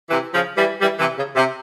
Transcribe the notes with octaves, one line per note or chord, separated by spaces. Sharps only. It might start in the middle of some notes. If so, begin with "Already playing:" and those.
C3 E3
C#3 F3
E3 G3
E3 G3
C3 E3
C#3
C3